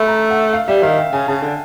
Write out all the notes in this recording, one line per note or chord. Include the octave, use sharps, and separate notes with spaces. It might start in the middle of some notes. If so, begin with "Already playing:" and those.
Already playing: A3 B5
A#5
F#5
F5
G3 E5
D#3 F5
G5
C#3 G#5
C#3 A5
D3